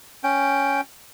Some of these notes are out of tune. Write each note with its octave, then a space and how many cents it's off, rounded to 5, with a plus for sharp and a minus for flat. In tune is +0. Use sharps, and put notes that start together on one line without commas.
C#4 +0 G5 +0